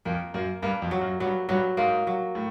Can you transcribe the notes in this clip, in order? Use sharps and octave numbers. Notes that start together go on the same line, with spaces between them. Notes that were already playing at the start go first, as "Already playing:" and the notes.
F2 A#3
F#2 A#3
G2 A#3
F2
F#3
F#2
G2 F#3
G2 F#3
G#2 A#3
F#3
A2